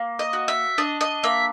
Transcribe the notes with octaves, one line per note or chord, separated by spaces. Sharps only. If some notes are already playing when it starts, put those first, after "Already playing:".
Already playing: A#3
D#5
F#4
E5
D4 D#5
D#5
A#3 E5